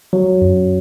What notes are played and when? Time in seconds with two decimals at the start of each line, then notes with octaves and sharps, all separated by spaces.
0.13 F#3
0.42 F#2